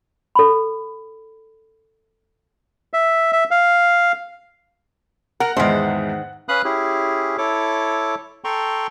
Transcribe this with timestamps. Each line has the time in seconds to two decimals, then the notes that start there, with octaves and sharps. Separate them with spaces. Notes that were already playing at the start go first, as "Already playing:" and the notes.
0.35 A4 B5
2.93 E5
3.33 E5
3.51 F5
5.40 A#4 F#5
5.57 E2 G#2 D#3 G#3 C5
6.49 C#4 B4 F5 B5 D#6 F#6
6.64 C#4 E4 G4 G#4
7.38 E4 A4 C#5 D6
8.44 A4 G5 A#5 C6 C#6